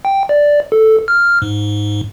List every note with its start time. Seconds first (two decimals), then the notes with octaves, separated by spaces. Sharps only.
0.05 G5
0.29 D5
0.72 A4
1.08 F6
1.42 G#2